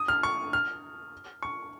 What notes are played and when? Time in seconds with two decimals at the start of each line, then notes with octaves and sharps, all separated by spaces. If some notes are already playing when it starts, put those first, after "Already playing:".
Already playing: D#6
0.08 F6
0.23 C#6
0.53 F6
1.43 C#6